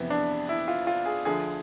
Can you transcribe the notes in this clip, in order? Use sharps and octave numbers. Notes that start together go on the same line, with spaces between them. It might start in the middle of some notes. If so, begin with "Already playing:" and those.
Already playing: F2 C3 E3 B3
D4
E4
F4
F4
G#4
D2 D3 F3 G#4